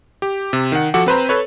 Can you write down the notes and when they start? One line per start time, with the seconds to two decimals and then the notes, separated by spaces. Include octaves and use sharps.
0.22 G4
0.53 C3
0.72 D#3 F#5
0.94 F3 F#4 A4 F#5 D6
1.06 C4 B4 C5 A#5
1.29 A4 B4 C#5